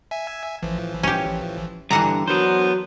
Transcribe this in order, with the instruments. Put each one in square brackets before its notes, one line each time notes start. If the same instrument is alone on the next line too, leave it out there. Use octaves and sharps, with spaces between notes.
[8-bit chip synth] E5 G#5
A1 E3 F3
[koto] C#4 G4
[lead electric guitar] G2 D3 [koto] E3 F#5 A#5
[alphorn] F#3 [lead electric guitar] B3 C5 [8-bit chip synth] D4 A#4